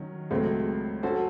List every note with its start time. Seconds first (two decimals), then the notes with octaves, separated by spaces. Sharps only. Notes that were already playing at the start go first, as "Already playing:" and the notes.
Already playing: D#3 F#3 C#4
0.30 C#2 C#3 F#3 A3 C4
1.03 F#3 C#4 F#4 A4 C5